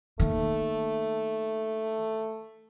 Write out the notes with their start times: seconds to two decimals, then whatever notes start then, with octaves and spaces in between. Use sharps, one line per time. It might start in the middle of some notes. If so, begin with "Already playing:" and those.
0.20 D#3 A3 A#3